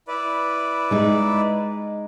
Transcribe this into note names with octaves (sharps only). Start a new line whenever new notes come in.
E4 B4 D5
G#3 D#4